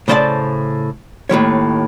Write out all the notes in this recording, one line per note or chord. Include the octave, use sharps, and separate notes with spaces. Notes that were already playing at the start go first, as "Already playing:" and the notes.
A2 C#3 C5 D5 F5 A5
D#2 A2 F3 C#5